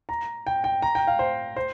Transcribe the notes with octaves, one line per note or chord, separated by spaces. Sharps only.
A#5
G5
G5
A#5
G5
F5
C5
C5